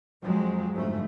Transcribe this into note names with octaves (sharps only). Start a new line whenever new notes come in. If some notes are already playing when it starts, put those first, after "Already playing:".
F2 F3 F#3 G#3 C4
G1 F2 G#2 F3 A3